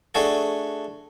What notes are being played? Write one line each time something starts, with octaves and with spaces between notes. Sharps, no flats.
A3 D4 F#4 G#4 A4